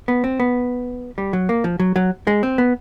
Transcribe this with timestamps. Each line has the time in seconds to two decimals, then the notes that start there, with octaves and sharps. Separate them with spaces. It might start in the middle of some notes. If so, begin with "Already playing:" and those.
0.08 B3
0.24 C4
0.40 B3
1.18 G3
1.33 F#3
1.49 A#3
1.64 F3
1.80 F#3
1.96 F#3
2.27 G#3
2.43 C4
2.58 B3